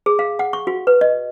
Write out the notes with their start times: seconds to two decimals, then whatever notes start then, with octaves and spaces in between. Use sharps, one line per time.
0.06 G#4
0.19 F5
0.39 F#5
0.53 C#6
0.67 F#4
0.87 B4
1.01 D#5